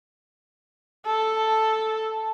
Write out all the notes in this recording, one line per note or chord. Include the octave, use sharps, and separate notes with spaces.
A4